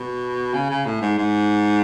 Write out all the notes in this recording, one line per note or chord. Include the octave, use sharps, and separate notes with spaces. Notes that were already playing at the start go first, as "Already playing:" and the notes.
Already playing: B2
C#3
C#3
A2
G#2
G#2